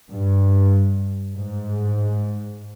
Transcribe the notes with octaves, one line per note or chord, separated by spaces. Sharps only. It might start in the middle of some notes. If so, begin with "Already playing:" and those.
G2
G#2